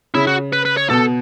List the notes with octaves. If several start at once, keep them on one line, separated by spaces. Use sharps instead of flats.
C#3 E4
F#4
B4
B4
C#5
B2 A4